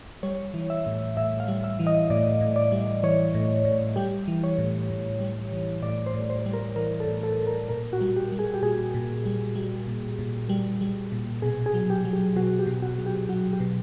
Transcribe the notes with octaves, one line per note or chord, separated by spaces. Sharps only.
G3 C#5
E3
E5
A2
A2 E5
F5
G3
E5
E3
D#5
A2 D5
A2
D5
G3
E3 C#5
A2
A2
G3 G4
E3
C#5
A2
A2
G3
E3
A2 D5
C5
A2
C5
G3
A#4
E3 A#4
A4
A2
A4
A2
A#4
A#2 A#4
F#4
G3
G4
G3
G#4
G4
A#2 G#4
A#2
G3
G3
A#2
A#2
G3
G3
A#2
B2 G#4
G#4
F#3
G4
F#3
G4
B2 F#4
G4
B2
F#4
F#3
G4
F#3 F#4
G4
B2